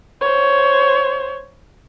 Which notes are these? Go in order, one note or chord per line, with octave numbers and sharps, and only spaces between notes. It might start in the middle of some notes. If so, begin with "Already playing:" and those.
C5 C#5